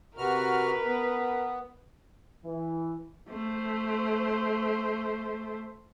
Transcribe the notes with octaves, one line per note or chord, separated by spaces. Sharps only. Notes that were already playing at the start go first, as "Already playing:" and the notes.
C3 F#4 A#4 B4 F6
B3
E3
A3 C5